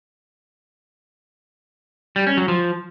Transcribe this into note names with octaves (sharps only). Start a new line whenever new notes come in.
G3
C#4
F#3
F3